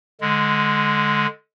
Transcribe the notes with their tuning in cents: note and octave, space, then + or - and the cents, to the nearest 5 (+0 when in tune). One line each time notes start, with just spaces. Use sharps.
D3 +0 G#3 +0